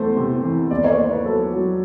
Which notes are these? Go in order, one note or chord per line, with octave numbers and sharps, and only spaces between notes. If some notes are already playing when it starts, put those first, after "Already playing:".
Already playing: E2 A3 C5
C3
E3
D#2 D5
C#5
A#3 C5
B4
F#3 A4
F#3